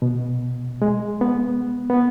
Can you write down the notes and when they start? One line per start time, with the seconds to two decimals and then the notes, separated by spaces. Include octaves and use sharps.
0.02 B2
0.82 G#3
1.21 B3
1.90 B3